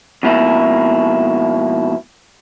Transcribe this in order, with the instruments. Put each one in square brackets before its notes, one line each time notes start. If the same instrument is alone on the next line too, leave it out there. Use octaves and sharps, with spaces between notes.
[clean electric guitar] F2 G#2 B2 A#3 E4